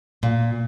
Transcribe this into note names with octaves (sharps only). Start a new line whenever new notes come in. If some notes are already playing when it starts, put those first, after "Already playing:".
A#2